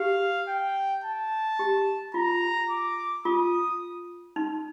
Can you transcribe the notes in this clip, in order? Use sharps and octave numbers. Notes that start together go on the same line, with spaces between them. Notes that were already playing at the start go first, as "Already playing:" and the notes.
Already playing: G4 F5
G5
A5
G4
F4 A#5
D6
F4 D#6
D#4